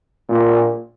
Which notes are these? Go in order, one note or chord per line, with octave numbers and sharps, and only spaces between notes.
A#2